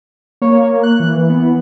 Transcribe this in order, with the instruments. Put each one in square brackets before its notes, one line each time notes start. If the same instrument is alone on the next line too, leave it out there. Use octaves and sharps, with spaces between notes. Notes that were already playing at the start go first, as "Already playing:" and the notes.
[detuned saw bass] A#3 [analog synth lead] C#5
[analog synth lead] F#6
[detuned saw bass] E3
[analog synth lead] B3